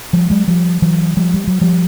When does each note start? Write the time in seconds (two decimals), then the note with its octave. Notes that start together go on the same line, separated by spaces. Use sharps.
0.13 F3 G3
0.30 F#3 G#3
0.48 F3 G3
0.82 E3 F#3
1.17 F3 G3
1.34 G3
1.47 F#3
1.61 F3 G3